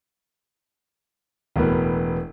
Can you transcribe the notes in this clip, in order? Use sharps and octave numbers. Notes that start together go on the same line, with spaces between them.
E1 A2 B3 A#4 B4